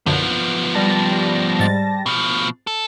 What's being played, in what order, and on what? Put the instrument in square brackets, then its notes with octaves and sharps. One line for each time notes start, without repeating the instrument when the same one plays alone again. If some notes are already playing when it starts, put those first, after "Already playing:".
[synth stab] B1 F#2 D3 [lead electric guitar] F3 B3
[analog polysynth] G3 A5 A#6
[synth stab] G#2 A6
[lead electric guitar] B2 F3
A4